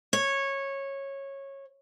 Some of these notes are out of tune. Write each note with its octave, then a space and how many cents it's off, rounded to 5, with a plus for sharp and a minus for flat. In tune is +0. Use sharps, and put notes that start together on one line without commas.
C#5 -15